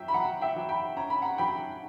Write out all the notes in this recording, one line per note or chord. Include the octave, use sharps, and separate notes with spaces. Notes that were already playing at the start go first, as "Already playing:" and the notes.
Already playing: F#3 E5 G5
B5
F#3 F#5 A#5
E5 G5
F#3
G5 B5
C#4 A#5
B5
F#5 A#5
F#3 G5 B5